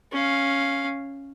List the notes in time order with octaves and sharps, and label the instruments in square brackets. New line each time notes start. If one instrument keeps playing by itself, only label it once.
[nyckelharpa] C#4 F5